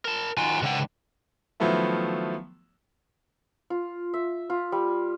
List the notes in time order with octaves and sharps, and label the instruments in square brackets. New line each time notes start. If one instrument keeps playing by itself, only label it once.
[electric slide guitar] A#4 A5
[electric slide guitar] D#3 F4 F#4 [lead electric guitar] F#5 G#5
[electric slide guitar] G#2 D4 G5 [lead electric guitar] C#3 F#5
[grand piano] D#3 F3 F#3 A3 B3 E4
[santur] F4
E5
F4
G3